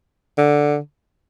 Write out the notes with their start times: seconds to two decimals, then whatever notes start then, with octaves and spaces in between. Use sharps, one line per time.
0.38 D3